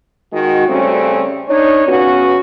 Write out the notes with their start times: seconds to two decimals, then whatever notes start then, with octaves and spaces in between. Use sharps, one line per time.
0.32 D#3 G#3 F#4
0.68 C#3 G3 A3 C4 C#4
1.48 D4 D#4 C#5
1.87 C#3 B3 C#4 F#4